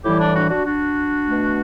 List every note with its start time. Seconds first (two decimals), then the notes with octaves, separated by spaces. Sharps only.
0.04 A2 E3 G3 E4 G4
0.20 D4
0.35 D4 F#4
0.50 D4 F#4
0.65 D4 F#4
1.27 B2 A3